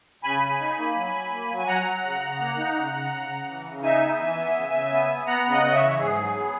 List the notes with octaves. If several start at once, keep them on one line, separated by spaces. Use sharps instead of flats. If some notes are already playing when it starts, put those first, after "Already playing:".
C#3 G#5 B5
C#3
D#4
A#3
F#3
F#3
A#3
F#3
G#5
F#3 F#5 A#5
F#3
C#3
C#3
A#3
D#4
C#3
C#3
C#3
C#3
E3
C#3
D#4 E5 G#5
B3
E3
B3
C#3
C#3
B3
B3
B3 F#5 A#5
C#3
D#5 F#5
C#3 D#5
C#5 E5
E3
G#2 G#4
F#3
B3